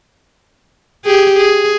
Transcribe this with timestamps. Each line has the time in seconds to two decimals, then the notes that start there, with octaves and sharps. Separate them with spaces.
1.05 G4 G#4
1.37 G#4